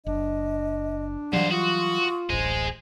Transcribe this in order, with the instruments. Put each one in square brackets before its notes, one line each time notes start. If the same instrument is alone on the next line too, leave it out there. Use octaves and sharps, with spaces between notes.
[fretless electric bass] F#1 [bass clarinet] D4 [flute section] D#5
[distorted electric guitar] G2 C5 [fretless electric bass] E3 F#3 G3 [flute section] D5 F5 F#5
[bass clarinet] F4 [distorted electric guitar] F#4 [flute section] C6 C#6 D#6
[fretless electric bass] D1 A1 [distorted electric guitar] G#4 D#5 [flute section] C5